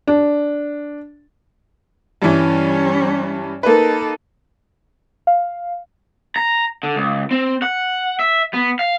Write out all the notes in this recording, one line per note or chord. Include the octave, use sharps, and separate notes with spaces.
D4
G2 E3 G3 C#4
A#3 D#4 A4 B4
F5
A#5
D3
C#2
C4
F#5
E5
B3
F5